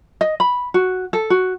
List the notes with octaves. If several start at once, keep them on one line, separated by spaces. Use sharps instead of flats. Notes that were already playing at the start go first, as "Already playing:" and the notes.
D#5
B5
F#4
A4
F#4